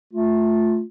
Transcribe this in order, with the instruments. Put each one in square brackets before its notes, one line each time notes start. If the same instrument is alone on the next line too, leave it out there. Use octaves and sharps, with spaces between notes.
[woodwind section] A3 F4